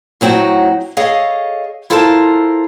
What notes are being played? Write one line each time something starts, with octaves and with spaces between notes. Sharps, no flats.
A2 F#3 C4 D#4 F#4
G#4 A4 C#5 D#5 F5
E4 F4 A4 A#4 C5 A5